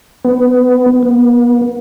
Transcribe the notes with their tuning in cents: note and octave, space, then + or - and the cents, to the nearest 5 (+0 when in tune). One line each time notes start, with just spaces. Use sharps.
B3 +25
B3 -35